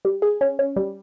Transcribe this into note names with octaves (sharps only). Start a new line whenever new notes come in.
G3
G#4
C#4
C#4
G3